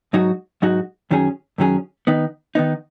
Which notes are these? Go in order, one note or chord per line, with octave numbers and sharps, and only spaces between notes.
G#2 F#3 D#4 F#4
G#2 F#3 D#4 F#4
F#2 D#3 F#3 C#4 G#4
F#2 D#3 F#3 C#4 G#4
D#3 B3 D#4
D#3 B3 D#4